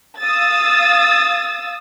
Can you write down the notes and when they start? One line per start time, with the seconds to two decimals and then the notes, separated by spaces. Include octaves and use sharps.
0.20 F5 D#6 E6 A6